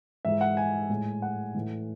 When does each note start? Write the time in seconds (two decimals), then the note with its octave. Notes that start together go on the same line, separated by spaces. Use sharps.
0.25 G#2 E3 G#3 E5
0.41 F#5
0.57 G#5
0.90 A2 G#3
1.22 F#5
1.55 A2 E3 A3